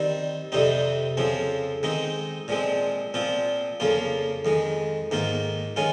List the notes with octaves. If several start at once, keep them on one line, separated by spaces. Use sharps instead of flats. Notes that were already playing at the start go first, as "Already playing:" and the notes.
Already playing: D#3 G3 C4
F2 C3 G3 C4 D#4
F2 C#3 F3 C4
D#3 G#3 C4 D#4
A#2 F3 G#3 C4
A#2 F3 C4 F4
F2 C#3 F3 A#3 F4
F2 D#3 G#3
G#2 D#3 A#3 F4
D#3 G#3 C#4 F4